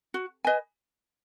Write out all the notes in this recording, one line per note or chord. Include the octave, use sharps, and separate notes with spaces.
F#4
B4 D#5 G#5